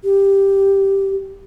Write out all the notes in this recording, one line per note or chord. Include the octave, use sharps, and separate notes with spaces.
G4